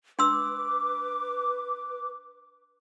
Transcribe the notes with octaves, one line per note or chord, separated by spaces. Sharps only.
D4 B4 C6 D6 E6